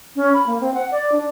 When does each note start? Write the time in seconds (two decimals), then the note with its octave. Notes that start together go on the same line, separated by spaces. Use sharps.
0.16 C#4
0.34 B5
0.47 A#3
0.61 C4
0.74 F#5
0.92 D5
1.12 D4